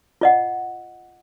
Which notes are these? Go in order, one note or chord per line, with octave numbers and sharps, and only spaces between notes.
F4 D#5 F#5